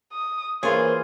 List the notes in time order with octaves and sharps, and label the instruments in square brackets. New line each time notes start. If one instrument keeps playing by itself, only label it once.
[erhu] D#6
[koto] E3 F4 G#4 [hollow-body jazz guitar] A#3 A#4 C#5 [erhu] C5